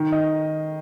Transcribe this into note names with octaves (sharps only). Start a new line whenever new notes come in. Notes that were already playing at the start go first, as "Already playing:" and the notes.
Already playing: D#3
D#5